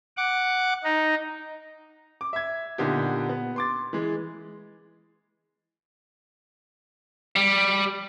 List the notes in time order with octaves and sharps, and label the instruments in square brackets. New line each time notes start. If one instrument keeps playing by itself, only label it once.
[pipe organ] F#5 D6
D#4
[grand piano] D6
E5 G#6
A#2 D3 B3 D#4 G4
B3
C6 D6 A6
E3 G#3
[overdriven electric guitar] G3